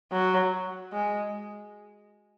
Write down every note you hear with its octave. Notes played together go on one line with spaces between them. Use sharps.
F#3
G#3